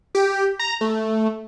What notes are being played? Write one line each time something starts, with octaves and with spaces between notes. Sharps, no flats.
G4
A#5
A3